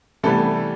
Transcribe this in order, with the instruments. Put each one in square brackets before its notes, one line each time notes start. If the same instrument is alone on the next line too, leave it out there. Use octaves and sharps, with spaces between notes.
[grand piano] C3 E3 G3 B3 [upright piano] A3 A4